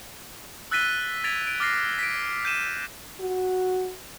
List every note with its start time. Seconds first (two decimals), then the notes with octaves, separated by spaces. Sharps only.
0.71 E6 F#6 A6 B6 D#7 G7
1.24 G#6 A6 B6 D7 F7
1.47 D7
1.60 D6 F6 A6 A#6 C7 D7
1.99 B6 D7
2.45 G6 D#7 E7
3.20 F#4